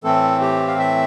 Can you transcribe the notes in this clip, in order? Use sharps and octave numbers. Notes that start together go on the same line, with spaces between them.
A2 E3 A3 C4 A4
G4
F5
E5